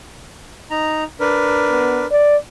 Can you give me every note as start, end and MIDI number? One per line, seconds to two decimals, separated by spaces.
0.71 1.04 63
0.71 1.04 82
1.20 2.06 62
1.20 2.06 70
1.20 2.06 71
1.70 2.00 59
2.11 2.36 74